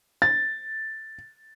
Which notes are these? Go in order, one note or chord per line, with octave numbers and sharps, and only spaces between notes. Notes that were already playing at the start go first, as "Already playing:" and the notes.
A6